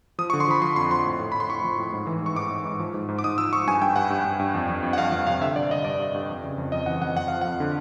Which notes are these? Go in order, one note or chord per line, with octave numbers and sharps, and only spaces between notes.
F3 D#6
C#6
D3
C6
F3 B5
F3 C6
F2 C6
F3 C6
A2
A2
A2 B5
C6
A2 C#6
F3
A2
G#2
E3
G#2 C#6
G#2 D6
G#2
G#2
F3
G#2
G#2
D6
G#2 D#6
F3 E6
F3 C#6
G2 G#5
G2 G5
G2 F#5
G2
G2
G2
F2
F2
F2
F#5
F2 F5
F2 F5
C3 F5
D3 E5
G2 D5
D3 D#5
G2 D5
G2
G2
F2
C#3
F2
F2 D#5
E3 F#5
F2 F#5
F2 F#5
F3 F5
F2 F#5
D3